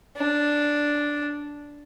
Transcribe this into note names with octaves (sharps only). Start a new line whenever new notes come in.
D4